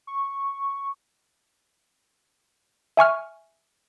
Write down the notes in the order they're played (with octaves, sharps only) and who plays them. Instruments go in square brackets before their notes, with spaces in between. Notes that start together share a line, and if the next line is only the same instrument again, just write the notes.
[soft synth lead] C#6
[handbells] E5 G#5 C#6 F6